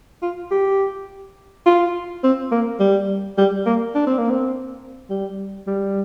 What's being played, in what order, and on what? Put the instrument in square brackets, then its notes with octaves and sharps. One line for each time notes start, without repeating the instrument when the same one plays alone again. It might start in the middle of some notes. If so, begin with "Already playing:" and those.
[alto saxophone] F4
G4
F4
C4
A#3
G3
G3
A#3
D4
C4
A#3
C4
G3
G3